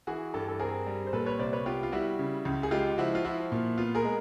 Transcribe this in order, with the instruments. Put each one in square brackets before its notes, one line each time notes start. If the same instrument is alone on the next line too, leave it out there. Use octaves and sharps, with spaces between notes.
[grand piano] E3 F#4 G#4
G2 G4 A4
A4
C4 G#4 A#4
G3
C5
A#2 A4 B4
B4 C#5
C2 C5 D5
B4 C#5
B3 F4 G4
F4
G3 E4 F#4
C#3
C#2
G#4
G#3 F4 G4
F3 E4 F#4
F4
F3 E4 F#4
A#2
B3 F4
G#4 A#4
G#3